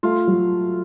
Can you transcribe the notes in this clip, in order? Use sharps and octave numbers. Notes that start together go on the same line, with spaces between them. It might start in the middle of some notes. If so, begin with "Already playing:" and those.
A3 F4
F#3